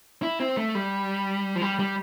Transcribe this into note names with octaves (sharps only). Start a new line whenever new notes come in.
E4
C4
A3
G3
F3
G3
G3